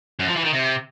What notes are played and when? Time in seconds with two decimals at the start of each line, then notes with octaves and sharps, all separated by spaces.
0.19 F#2
0.28 F3
0.36 E3
0.44 D#3
0.53 C3